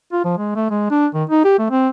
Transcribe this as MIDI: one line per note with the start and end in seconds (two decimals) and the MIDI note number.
0.12 0.24 65
0.25 0.38 53
0.38 0.54 56
0.56 0.67 57
0.70 0.88 56
0.90 1.07 62
1.14 1.24 51
1.30 1.43 63
1.44 1.59 67
1.59 1.67 57
1.70 1.89 60